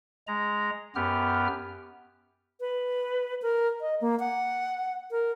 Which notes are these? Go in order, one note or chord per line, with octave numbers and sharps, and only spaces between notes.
G#3 A#5
F#2 B3 G4 F6
B4
A#4
D#5
A#3
F#5
A#4